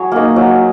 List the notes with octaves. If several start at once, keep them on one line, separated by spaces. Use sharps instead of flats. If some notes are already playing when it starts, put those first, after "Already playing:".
Already playing: F#3 G#4 C#5
A#3 D#4
F#3